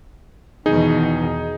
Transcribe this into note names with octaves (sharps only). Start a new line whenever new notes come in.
E2 B2 D#3 D#4 G#4